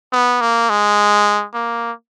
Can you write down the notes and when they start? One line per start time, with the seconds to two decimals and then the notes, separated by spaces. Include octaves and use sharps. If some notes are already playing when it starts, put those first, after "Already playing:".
0.12 B3
0.41 A#3
0.69 G#3
1.54 A#3